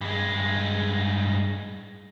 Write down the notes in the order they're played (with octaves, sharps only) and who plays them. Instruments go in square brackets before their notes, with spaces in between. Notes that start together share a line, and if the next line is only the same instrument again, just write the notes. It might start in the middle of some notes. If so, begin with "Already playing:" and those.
[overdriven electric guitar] G2 G#3